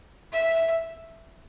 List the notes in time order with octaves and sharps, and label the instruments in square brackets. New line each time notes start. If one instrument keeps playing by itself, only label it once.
[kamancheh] E5